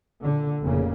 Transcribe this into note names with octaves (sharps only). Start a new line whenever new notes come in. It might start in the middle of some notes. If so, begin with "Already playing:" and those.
A#2 D3
F1 A#2 C#3 A#3